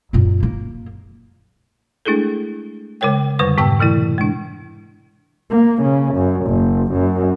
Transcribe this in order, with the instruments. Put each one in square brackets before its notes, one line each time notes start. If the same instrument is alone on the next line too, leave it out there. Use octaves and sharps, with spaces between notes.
[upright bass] F#2 A#2
A#3
[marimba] G#3 A3 D4 E4 G#4 A4
C#3 G#3 A#4 C#5 G5
F2 D3 G3 B4 C#6 A#6
G#2 C3 B3 G5 A5 E6
B2 E3 A3 E4
G#3 D4
[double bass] A#3
C#3
F#2
F#1
F#2